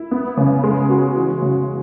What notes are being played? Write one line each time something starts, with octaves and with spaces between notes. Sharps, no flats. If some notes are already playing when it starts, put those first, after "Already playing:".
Already playing: E4
B3
C#3
G#3
F#4
E3
C#3